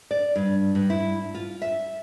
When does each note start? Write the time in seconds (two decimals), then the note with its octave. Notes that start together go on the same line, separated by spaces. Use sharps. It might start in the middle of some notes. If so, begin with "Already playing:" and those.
0.11 D5
0.36 G2
0.75 G2
0.90 E4
1.35 F4
1.62 E5